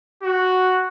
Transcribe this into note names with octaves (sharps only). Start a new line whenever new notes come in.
F#4